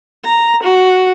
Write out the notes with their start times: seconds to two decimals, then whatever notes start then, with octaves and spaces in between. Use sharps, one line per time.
0.25 A#5
0.63 F#4